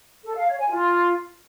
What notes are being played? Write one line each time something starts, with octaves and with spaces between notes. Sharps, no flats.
A4
F5
C#5
G#5
F4